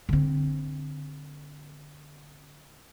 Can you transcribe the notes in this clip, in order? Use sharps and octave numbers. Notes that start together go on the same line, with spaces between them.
D3 C4